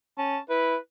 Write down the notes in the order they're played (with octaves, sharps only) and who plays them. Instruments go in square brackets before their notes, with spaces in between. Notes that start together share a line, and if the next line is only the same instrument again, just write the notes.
[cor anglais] C#4 [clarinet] A5
[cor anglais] E4 [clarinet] B4